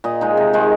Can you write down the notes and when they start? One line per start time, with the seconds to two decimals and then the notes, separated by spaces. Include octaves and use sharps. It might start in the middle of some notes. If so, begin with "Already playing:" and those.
0.04 A#2 D#5
0.21 G#3 D#4
0.37 C3
0.53 D#3 G#3 D#4